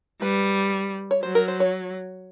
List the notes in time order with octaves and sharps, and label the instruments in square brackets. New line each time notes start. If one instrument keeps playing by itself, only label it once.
[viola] G3 [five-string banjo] B4
[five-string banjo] C#5
[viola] F#3 [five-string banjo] C5
[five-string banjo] A#4
C5
C#5